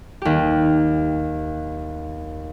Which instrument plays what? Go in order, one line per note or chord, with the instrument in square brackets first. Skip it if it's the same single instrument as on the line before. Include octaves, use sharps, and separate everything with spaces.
[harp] D#2 G4